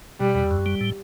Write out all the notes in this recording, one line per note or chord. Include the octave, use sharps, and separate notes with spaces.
B2 G3
E2
F#2
G3
A2